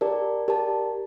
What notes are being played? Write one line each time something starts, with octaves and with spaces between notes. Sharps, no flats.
G4 A#4 D5 A5
G4 A#4 D5 A5